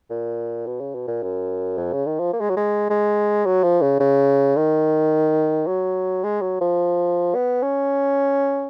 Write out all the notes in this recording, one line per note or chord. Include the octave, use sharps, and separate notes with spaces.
A#2
B2
C#3
B2
A#2
F#2
F2
C#3
D#3
F3
A#3
G#3
F#3
G#3
G#3
F#3
F3
C#3
C#3
D#3
F#3
G#3
F#3
F3
B3
C#4